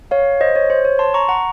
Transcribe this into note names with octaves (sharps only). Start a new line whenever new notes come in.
C#5 F5
C5 D#5
C#5
C5
C#5
A5 C6
A#5 C#6
F#5 A#5